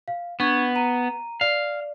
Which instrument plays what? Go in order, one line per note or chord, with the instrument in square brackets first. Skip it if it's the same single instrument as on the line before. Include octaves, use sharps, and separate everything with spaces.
[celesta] F5
[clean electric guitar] B3 [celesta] D4 C#6 G#6
[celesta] A#5 D#7
[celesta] D5 [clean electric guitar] F5